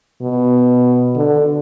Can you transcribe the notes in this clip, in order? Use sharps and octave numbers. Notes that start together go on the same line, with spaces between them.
B2
D3